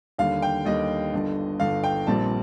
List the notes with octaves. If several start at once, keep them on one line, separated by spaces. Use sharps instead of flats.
D#2 D3 G3 F5
G5
D#2 D3 G3 D#5
G1 G2 D3
G1 G2 D3 F5
G5
A#1 A#2 G3 C4 A5